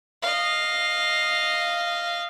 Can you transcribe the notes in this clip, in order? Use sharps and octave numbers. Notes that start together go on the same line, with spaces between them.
D#5 F5